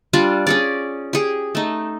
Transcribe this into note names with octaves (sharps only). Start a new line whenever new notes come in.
G3 D4 F4
C#4 G#4 D5
G4 G#4
A3 D#4